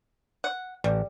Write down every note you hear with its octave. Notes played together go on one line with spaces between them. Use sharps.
F#5
A1 G3